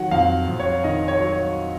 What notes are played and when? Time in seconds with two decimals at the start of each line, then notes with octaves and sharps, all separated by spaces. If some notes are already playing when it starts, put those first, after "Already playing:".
Already playing: D#3 F#3 F#5
0.11 F2 F5
0.48 F2
0.60 C#5
0.84 D#3 D#5
1.08 C#5
1.20 F#3
1.32 C#5